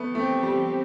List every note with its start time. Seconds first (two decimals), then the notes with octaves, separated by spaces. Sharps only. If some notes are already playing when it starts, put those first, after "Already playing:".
Already playing: A3 B3
0.15 F3 A3 C4 G4
0.43 G3